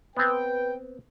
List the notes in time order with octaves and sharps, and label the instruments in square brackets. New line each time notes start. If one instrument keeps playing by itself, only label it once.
[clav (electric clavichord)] B3 C4 [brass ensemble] B4 G5